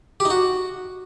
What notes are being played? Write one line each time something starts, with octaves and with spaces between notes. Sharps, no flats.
G4
D#4
F#4